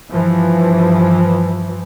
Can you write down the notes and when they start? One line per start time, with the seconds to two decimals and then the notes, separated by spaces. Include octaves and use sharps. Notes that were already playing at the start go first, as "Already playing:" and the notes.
0.11 G2 E3 F3